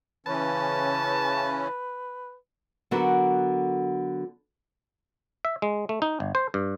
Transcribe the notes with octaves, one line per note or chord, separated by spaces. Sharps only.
C#3 E3 C#4 B4 A5
D3 F#3 B3 F#4 A4 A#4
E5
G#3
A3
D#4
G1
C5
G2